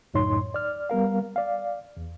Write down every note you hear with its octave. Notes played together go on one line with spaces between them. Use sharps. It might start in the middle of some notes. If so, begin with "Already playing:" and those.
C#2 F#2 A2 D#4 C#5 C6
D5 F6
G3 B3 A#4 F5
D5 F5
E2